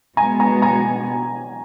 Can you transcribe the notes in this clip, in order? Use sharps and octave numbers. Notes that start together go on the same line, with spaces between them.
B2 G#3 B3 G#5 A#5
G#5 A#5
G#5 A#5